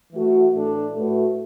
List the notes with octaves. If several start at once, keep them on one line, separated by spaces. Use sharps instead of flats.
E3 A3 F#4 A4
A2 E3 A3 D4 A4
A2 A3 F#4 B4